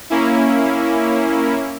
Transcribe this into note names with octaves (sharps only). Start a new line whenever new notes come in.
A#3 C#4 E4